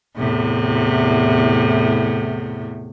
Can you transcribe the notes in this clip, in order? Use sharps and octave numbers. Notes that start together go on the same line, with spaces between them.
E2 A2 C3